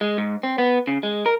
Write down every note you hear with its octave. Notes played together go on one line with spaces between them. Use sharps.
G#3
G#2
C4
B3
C#3
G#3
A#4